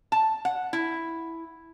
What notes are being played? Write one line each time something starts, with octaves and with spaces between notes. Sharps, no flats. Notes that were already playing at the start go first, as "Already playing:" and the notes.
A5
F#5
E4